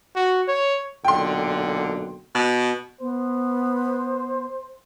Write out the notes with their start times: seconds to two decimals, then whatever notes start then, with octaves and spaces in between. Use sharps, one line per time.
0.16 F#4
0.48 C#5
1.05 B1 A#2 D3 G5 C6
2.35 B2
3.01 B3 C5